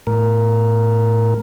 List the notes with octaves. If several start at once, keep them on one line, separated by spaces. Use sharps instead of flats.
A2 A#4